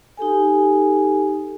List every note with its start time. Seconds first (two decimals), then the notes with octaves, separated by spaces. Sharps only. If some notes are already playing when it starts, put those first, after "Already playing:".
0.17 D#4 G4 A4 G#5